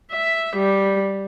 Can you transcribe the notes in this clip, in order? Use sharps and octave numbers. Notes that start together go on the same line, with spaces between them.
E5
G3